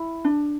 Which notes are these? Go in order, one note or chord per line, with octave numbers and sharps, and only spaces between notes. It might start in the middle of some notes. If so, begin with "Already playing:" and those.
Already playing: E4
D4